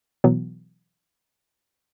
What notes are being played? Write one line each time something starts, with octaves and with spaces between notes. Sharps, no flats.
B2 E3 F#3 B3